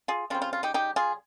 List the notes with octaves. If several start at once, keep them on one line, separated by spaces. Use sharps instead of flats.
F4 G#4
C#3 G3 C4 F4
F4
F4
D#4 G4
D#4 G4
F4 G#4